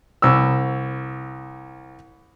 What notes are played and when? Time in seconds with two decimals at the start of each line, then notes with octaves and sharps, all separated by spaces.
0.22 C2 E6